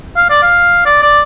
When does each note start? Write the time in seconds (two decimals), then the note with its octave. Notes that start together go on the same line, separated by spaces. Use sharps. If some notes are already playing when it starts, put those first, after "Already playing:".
0.16 F5
0.30 D5
0.43 F5
0.85 D5
1.02 D5